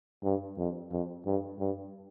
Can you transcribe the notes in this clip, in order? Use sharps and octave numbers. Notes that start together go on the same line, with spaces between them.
G2
F2
F2
G2
G2